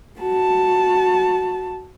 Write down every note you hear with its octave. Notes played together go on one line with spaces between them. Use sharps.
F#4 A5